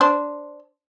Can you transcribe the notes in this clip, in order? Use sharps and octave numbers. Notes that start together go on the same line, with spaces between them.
D4 C5